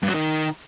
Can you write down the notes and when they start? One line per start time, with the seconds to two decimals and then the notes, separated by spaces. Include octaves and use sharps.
0.03 G2
0.09 F#3
0.15 D#3